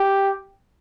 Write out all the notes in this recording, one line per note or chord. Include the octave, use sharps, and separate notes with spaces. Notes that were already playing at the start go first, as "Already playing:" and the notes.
Already playing: G4